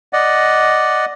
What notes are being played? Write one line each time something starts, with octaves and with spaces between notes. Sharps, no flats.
D5 D#5 F#5